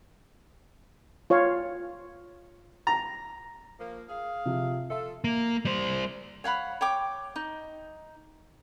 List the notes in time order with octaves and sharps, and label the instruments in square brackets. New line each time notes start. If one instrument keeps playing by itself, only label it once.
[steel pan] F4 C#5 F5
[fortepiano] A#5
[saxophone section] F3 A#3
G#4 F5
[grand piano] C3 F3
[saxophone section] F4 A4 [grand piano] E5
[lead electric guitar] A#3
G3 C5
[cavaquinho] C#5 F5 F#5 B5
C#5 G5 D6
D#4